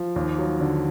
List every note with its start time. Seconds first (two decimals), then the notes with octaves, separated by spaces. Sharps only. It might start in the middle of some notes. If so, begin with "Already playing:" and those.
Already playing: F3
0.16 D#2
0.39 F#3
0.60 D3